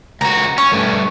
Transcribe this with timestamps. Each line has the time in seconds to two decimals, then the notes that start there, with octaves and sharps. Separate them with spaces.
0.21 C#2 F#4 A#5
0.58 C#4 C#6
0.73 G2 A3